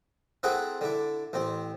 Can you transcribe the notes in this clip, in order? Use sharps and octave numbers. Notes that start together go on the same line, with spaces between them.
C4 E4 G#4 A4 F#5
D3 E4
A1 C4